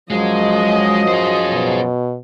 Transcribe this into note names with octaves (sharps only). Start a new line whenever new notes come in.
F#2 F3 F#3 G#3 D#5
G#4 C5
B2